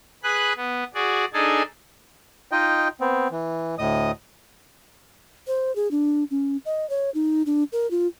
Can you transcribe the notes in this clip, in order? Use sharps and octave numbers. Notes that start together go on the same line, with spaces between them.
G#4 B4 B5 F#6
B3
F#4 G#4 D5
D4 D#4 G#4 A4 G#5 A5
D#4 F4 D#5 G5
B3 C4
E3
D2 A2 D#5 D#6
C5
G#4
D4
C#4
D#5
C#5
D#4
D4
A#4
F4